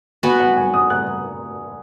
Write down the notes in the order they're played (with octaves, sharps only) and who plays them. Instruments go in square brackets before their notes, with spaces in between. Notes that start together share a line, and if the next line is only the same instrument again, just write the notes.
[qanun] B3 F#4 B4 [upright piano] G#5
[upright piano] F#5
G#5
D#6
F#6